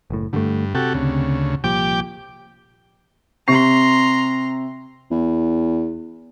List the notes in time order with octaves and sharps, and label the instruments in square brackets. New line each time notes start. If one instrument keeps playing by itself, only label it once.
[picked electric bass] F#1 A2
[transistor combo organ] G2 [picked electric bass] D3 A3
[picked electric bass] C3 [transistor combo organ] F#4 G4 A4
[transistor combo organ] D2 C#3
[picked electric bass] C2 A#2 F3 [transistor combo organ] G4 G5 D6
[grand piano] C3 C#6 C7 [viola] A#5 C6
[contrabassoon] E2